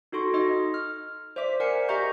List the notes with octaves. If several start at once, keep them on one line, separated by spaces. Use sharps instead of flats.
D#4 F#4 A4 C6 C#6
D#4 D#5 C6
F6
C5 D5 E5 D6 B6
A#4 D5 F#5 G#5 C7 C#7
G4 D#5 E5 A#5 C#6 G6